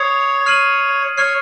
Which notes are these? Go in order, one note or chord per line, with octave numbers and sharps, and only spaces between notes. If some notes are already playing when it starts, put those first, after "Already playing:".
Already playing: C#5 D#6 G#6 C7 F7
F6 C7 D#7 F#7
C#5 C#6 F6 C7